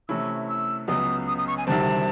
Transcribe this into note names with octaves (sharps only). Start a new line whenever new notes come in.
C3 E3 A3 C#4 E4 E6
E6
C#2 C#3 F#3 B3 D#6
D#6
D#6
C#6
G#5
D2 C3 D#3 G3 C4 A5